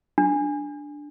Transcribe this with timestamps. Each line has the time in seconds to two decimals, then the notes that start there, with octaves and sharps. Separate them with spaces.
0.18 D4